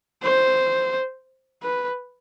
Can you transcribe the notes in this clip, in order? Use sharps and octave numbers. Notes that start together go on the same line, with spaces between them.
C5
B4